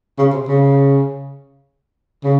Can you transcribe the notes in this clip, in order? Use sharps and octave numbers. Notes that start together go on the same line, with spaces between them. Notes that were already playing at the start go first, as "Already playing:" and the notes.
C#3
C3
C#3
C#3